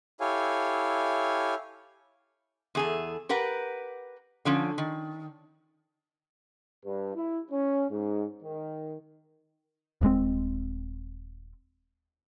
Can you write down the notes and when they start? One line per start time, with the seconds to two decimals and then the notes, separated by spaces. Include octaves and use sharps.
0.20 E4 G4 A4 C#5 F5 G#5
2.75 E2 G#4 A4
3.29 G4 A#4 B4 F#5
4.45 D3 F3 C#4
4.78 D#3
6.84 G2
7.14 E4
7.50 C#4
7.90 G#2
8.42 D#3
10.01 D#1 G2 G#3 C4